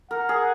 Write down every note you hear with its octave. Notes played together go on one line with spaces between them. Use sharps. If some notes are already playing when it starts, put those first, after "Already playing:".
A#4 F#5
G#4